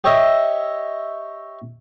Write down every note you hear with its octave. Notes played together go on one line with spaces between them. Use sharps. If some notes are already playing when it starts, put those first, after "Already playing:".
G4 C#5 D#5 E5